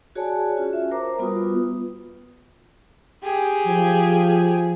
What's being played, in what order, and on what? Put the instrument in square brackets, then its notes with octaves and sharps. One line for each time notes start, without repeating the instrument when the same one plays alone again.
[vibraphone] F#4 G#4 C#5 D5 G#5 A5
C#4 F4 F#4
F#4 E5
A#4 C5 A#5 D6
G3 B3 F4 F#4 B4 D#6
[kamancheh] G4 G#4
[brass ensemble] F3